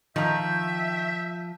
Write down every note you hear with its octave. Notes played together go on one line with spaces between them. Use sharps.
D#3 F3 E5 G5 A#5 G6